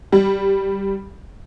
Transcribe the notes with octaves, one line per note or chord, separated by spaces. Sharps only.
G3